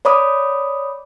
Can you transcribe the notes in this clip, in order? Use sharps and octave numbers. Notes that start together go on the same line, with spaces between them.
C#5 D5 B5 D6 D#6